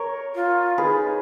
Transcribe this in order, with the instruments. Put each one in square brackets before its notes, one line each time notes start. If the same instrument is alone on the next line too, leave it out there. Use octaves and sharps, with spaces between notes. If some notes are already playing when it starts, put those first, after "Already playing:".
Already playing: [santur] A#4 C#5
[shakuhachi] F4
[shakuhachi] D#4 [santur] G#4 B4